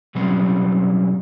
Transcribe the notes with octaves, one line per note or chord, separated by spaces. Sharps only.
B2 F#3 G3 C4 C#4